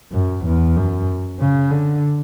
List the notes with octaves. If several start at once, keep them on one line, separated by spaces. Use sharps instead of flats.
F#2
E2
F#2
C#3
D3